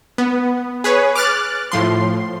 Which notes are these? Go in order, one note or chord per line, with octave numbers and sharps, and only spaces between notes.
B3
G#4 B4 C#5
D6 F6 F#6 A6
A2 F3 C6